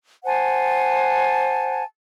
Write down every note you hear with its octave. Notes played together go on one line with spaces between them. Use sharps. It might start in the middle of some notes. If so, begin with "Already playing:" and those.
C5 F#5 G#5 A5